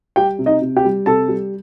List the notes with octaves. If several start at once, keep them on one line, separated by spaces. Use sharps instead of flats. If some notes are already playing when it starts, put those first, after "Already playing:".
G3 G4 G5
C3
D#4 D#5
C3
G4 G5
G3
C3 A4 A5
G3